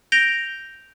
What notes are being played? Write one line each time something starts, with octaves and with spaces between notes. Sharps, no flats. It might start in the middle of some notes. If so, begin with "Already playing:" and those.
G6 A#6 D7 F7 G7